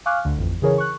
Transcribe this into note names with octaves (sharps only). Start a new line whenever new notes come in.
F5 G#5 C#6 D6 F6 F#6
D2 D3
A1 F2
C#3 E3 G#4 A#4 C#5
C#6 F#6